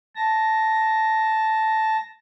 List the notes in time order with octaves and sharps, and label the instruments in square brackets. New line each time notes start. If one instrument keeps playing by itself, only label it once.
[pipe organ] A5 A#6